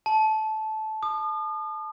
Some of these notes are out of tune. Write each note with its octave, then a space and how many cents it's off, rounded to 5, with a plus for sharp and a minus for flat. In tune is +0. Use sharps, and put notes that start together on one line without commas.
A5 -15
D#6 -40